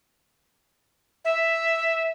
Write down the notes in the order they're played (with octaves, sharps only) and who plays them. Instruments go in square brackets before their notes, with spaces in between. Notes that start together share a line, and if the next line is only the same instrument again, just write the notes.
[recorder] E5